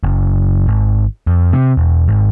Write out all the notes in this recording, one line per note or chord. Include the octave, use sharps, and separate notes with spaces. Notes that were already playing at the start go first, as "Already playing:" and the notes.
F#1
G#1
F2
C3
E1
G#1